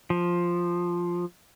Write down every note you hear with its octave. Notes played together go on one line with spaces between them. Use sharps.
F3